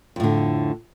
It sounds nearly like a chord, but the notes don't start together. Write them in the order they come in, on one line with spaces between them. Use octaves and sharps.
F2 A2 D3